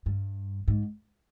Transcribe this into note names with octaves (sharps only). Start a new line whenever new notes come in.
G2
G#2